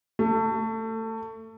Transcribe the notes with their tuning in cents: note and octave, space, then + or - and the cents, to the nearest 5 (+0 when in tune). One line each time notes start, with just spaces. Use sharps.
A3 +25